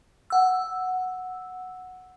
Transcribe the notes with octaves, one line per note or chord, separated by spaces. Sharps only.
F#5 E6